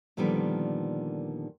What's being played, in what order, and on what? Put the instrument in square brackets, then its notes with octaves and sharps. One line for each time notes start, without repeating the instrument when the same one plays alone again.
[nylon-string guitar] A#2 D3 D#3 F3 G3 B3